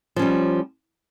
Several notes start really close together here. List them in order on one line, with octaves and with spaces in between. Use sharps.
F3 C#4 G3